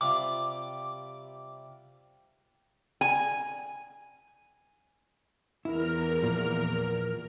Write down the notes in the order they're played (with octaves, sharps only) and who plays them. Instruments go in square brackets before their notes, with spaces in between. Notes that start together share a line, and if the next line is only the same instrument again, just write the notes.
[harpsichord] C3 G3 F4 [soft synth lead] D6
[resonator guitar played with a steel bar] G#5
[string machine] E2 A#4 F6 [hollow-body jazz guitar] E4
[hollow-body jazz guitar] A#2 F3 A#3